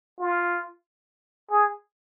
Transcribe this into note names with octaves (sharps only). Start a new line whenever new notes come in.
F4
G#4